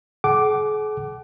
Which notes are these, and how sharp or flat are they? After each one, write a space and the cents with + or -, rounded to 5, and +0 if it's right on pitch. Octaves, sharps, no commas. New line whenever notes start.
G#4 +45 F#5 +35 D6 +0